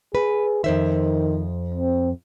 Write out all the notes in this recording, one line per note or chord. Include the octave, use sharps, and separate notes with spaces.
G#4 B4
F2 D#3 C5 E5
C4